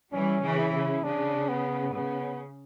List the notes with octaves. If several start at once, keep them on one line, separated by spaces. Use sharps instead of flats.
E3 G3 C#4
C#3 E3
E4
C#3
C#3 D4
B3
C#3 B3